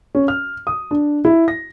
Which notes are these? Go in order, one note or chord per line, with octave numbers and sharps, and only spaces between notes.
C#4
F6
D#6
D4
E4
A#6